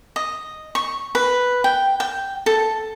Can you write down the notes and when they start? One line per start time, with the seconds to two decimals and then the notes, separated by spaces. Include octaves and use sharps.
0.16 D#5
0.75 C#6
1.15 B4
1.64 G5
2.00 G5
2.46 A4